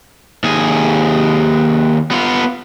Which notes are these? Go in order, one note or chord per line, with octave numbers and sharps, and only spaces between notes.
D#2 G#4
B3 F4